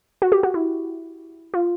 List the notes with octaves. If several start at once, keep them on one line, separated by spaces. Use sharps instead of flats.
F#4
G4
F#4
E4
F4